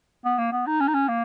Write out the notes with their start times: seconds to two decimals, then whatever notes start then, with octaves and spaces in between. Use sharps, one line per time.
0.25 B3
0.38 A#3
0.52 B3
0.66 D#4
0.80 C#4
0.88 D#4
0.94 C#4
1.08 A#3